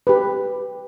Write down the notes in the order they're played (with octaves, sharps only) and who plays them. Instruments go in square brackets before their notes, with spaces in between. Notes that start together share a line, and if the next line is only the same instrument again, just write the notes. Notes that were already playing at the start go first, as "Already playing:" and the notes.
[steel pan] G4 B4